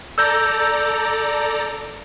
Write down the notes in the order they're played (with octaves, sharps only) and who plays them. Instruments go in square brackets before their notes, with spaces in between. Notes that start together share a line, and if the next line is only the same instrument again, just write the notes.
[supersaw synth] A4 D5 A#5 [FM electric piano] E6 G6 A#6